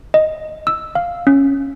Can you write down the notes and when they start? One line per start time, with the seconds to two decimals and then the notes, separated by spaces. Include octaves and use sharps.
0.14 D#5
0.67 E6
0.95 F5
1.27 C#4